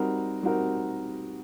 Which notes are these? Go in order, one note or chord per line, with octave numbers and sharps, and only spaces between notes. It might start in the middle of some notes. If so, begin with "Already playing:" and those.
Already playing: G3 C4 D#4 F#4 A#4
G3 C4 D#4 F#4 A#4